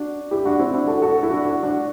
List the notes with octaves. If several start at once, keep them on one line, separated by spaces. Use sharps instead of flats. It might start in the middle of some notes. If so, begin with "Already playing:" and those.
Already playing: D4 F#4
E4 G4
D4 F#4
C4 E4
D4 F#4
F#4 A4
F#4 A4
E4
D4 F#4
D4 F#4
D4 F#4